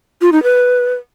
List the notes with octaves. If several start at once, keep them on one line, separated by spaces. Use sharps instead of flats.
F4
D#4
B4